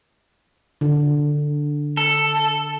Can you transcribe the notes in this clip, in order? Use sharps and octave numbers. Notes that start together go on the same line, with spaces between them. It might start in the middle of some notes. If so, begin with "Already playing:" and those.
D3
A4